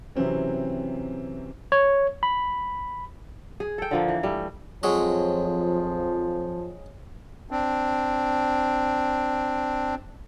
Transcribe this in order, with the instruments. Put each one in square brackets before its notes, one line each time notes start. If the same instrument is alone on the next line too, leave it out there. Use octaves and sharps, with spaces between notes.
[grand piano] C3 E3 F#3 C4 C#4
[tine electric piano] C#5
B5
[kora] G#4
A4 G5
D3 F3 A#3
E3
G3 A3
[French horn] F2 [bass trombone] F3 [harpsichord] F#3 G#3 C#5
[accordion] C4 D4